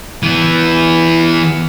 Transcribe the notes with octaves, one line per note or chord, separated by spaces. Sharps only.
E3 B3